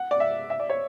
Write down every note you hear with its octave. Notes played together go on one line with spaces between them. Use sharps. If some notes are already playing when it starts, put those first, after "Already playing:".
Already playing: F#5
D5
E5
E5
D5
C#5